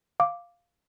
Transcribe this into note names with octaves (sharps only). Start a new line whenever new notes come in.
F5 D6